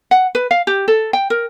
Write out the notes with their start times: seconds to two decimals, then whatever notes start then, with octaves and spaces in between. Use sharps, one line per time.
0.11 F#5
0.35 B4
0.51 F5
0.67 G4
0.88 A4
1.13 G5
1.30 A#4